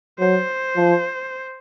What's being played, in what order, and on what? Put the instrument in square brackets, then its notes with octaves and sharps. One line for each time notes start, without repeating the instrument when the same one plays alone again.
[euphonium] F#3 [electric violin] C5
[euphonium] F3